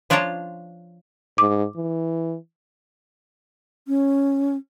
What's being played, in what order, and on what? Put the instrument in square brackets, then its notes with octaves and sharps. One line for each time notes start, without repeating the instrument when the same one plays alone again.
[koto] F3 D4 F4 C#5 A5 A#5
[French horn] G#2 [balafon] D6
[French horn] E3
[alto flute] C#4